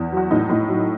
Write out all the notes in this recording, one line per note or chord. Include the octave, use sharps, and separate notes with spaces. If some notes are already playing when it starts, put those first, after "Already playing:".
Already playing: E2
F#3 F#4
A2 D#4
A2
F#3